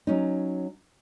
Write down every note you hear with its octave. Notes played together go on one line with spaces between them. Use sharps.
F#3 C#4 D#4